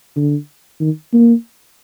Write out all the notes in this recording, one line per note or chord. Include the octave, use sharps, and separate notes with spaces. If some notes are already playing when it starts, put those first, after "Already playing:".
D3
D#3
A#3